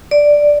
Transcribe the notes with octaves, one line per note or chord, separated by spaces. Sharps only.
D5